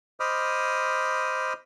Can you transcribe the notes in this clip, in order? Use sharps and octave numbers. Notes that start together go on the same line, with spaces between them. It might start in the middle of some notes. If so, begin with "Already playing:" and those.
C5 D#5 B5 D6 D#6 F6